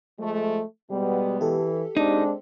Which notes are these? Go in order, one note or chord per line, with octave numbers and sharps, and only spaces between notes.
F3 G#3 A3
B2 G3 G#3 B3
E3 G4 A4
G#3 C4 D4 D#4